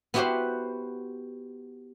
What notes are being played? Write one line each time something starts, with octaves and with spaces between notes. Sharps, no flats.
B3 E4 F#4 G4 B4 C5